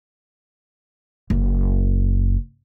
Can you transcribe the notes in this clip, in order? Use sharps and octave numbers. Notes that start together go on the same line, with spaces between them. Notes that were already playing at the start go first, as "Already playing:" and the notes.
F#1